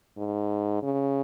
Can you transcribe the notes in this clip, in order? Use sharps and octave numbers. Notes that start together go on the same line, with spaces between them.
G#2
C#3